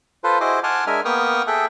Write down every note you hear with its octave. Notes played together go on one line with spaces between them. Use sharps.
F4 A4 B4 C5
E4 F#4 G#4 C5 D#5 D6
F#5 G#5 A5 C6 D6 F6
G#3 D4 A#4 E5 G#5 F6
A#3 B3 G5 C#6 D#6 F6
G#4 A4 E5 G5 F#6